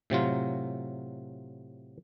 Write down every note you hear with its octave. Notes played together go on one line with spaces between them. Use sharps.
A2 C3 F#3 F4